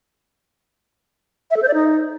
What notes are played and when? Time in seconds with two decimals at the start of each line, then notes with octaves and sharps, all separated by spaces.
1.51 E5
1.56 A4
1.62 C5
1.68 D5
1.74 D#4